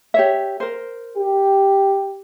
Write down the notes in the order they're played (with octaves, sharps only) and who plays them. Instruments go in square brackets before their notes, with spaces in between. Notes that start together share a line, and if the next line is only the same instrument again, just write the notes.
[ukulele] G4 C#5 E5
A#4 C5
[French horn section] G4